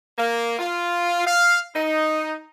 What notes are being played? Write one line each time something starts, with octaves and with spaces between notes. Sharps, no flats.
A#3
F4
F5
D#4